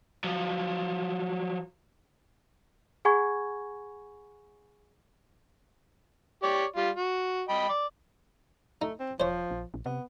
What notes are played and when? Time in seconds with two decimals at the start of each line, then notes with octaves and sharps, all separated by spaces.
0.24 F3 F#3
3.05 G#4 F#5 G#5 B5 C#6 G#6
6.43 G4 C#5 D5
6.76 G3 F4
6.96 F#4
7.49 D#5 G5 B5
7.69 D5
8.82 A3 D#4
9.00 C4
9.20 E1 F3 C5 C#5
9.51 A#1
9.74 A#1
9.86 C3 B3